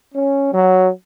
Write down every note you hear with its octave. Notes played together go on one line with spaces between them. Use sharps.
C#4
F#3